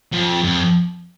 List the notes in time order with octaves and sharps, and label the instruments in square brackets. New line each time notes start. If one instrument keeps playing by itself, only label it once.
[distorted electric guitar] F2
F2